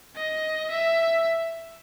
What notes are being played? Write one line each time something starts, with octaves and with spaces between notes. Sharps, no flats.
D#5
E5